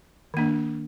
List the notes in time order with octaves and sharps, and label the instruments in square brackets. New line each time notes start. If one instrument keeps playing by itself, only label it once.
[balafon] D#3 A#3 D4